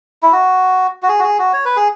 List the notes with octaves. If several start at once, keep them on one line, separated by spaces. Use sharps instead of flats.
E4
F#4
F#4
G#4
F#4
G#4
F#4
C#5
B4
G#4